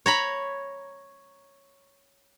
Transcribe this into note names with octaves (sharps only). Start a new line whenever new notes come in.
C#5 A#5 B5